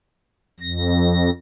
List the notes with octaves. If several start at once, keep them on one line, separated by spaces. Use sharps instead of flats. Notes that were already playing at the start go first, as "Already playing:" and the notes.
F2 A#6